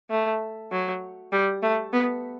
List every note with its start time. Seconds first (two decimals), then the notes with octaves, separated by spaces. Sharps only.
0.10 A3
0.72 F#3
1.32 G3
1.62 A3
1.93 B3